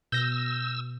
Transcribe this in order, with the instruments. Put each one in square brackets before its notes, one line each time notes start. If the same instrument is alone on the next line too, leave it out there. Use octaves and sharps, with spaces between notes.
[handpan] B2 [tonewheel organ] E6 [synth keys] G6 A#6